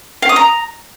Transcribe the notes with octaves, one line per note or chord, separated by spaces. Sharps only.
F5
D#6
A#5